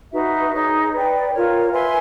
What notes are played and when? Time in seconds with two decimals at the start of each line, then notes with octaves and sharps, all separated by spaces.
0.12 D#4 F#4 B4 E5
0.53 D#4 G#4 C#5
0.92 B4 D5 G5
1.32 F4 A#4 C#5
1.72 B4 E5 G#5 C6